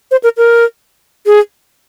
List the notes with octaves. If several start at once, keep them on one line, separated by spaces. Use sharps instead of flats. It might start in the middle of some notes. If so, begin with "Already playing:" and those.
C5
A#4
A#4
G#4